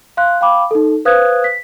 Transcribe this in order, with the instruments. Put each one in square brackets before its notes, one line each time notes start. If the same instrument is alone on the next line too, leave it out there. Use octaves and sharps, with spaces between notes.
[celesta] F5 C6 F#6
F5 G5 B5 D6
D#4 A4
B4 C5 F5 D#6 F#6 G#6
B6